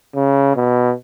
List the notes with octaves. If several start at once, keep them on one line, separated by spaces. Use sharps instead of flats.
C#3
B2